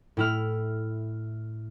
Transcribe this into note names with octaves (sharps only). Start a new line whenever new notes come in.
A2 E4 F6